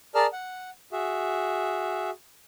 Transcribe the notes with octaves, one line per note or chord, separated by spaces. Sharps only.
G#4 A#4 D5 A5 F6
F#5
F#4 G#4 E5